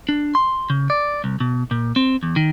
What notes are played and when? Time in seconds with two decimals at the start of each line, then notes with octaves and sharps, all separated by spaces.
0.09 D4
0.35 C6
0.70 C#3
0.90 D5
1.24 C2
1.40 B2
1.71 A#2
1.96 C4
2.23 E2
2.36 D#3